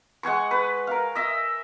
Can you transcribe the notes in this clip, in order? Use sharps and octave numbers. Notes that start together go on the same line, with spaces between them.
G#3 F#5 G#5 C#6
B4
A#4 F5
D#5 E5